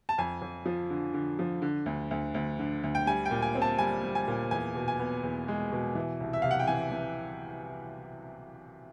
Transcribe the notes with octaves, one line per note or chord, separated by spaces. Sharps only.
A5
F2 G#5
F2
F3
D3
D3
F3
D3
D2
D2
D2
D3
D2
G5
G3 G#5
G5
A#2
G#5
C4
A5
G3 G#5
G3
G#5
A#2
E2 G#5
B2
G#5
B3
E2
G#3
B2
E3
C2
E5
C3 F5
F#5
G5
E3 G#5
E3